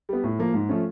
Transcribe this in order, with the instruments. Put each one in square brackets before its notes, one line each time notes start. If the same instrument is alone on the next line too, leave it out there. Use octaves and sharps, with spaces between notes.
[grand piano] G3 B3
A2
F3 A#3
G#2
F3 A3 C#4